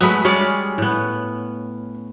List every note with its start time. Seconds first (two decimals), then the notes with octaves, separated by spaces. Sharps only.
0.01 F#3 G#3 A3 B3 B5
0.25 G3 G#3 C#4 D5
0.78 A2 B3